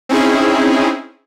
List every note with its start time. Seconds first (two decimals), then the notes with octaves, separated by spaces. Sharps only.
0.09 C4 C#4 D#4 E4 G#4